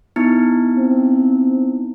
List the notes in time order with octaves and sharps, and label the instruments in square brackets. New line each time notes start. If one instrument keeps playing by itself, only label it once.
[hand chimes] B3 D#4 E4
[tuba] C4